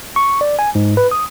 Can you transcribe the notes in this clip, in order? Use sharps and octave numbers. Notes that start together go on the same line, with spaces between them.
C#6
D5
G#5
G#2
B4
D#6